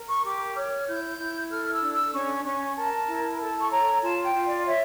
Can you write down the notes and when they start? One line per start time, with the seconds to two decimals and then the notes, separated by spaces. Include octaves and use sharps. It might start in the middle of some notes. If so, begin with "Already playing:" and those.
Already playing: A#4
0.08 C#6
0.24 G4 D6
0.55 C#5 F6
0.86 E4 G6
1.19 E4
1.50 A4 F6
1.72 E6
1.81 D4
1.92 E6
2.14 C#4 C#6
2.44 C#4 C#6
2.77 A#4 A5
3.08 E4
3.40 A4 A5
3.60 C#6
3.71 C#5 A#5
4.03 F4 A5
4.24 G5
4.35 F4
4.45 D5
4.66 C#5 E5